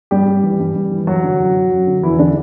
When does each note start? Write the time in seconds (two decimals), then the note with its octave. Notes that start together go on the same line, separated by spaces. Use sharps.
0.11 G2 G3 G4
0.27 G2
0.43 E3
0.60 G2
0.75 G2
0.91 E3
1.07 F#2 F#3 F#4
1.23 D3
1.39 F#2
1.55 F#2
1.71 F#2
1.87 D3
2.03 E2 E3 E4
2.19 D3 D4